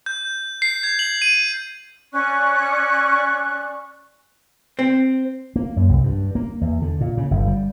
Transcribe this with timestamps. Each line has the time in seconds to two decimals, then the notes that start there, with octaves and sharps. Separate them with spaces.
0.06 G6
0.62 C7
0.83 G#6
0.99 F#7
1.22 D#7
2.13 C#4 D5 C#6 F#6
4.79 C4
5.56 A#3
5.76 F#2
5.89 C2
6.04 G2
6.35 A#3
6.61 E2
6.82 D3
7.01 A#2
7.17 C#3
7.31 G1
7.47 G3